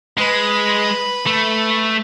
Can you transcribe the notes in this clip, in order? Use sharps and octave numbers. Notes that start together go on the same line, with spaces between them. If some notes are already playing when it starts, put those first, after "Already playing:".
G#3 B4
A3